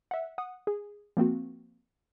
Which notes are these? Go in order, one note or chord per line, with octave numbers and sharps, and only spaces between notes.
E5 F#5
F#5 D#6
G#4
F3 A#3 C4 F#4